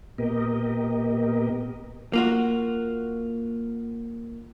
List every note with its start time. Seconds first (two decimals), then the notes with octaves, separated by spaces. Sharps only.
0.18 A#2 B3 G4 A#4 D#5
2.13 A#3 F4 F#4